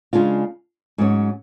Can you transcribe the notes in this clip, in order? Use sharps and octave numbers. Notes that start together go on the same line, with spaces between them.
C#3 G#3 D4 F4
G#2 F#3 C#4